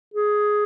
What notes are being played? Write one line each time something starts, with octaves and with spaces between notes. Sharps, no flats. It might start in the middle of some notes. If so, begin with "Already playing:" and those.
G#4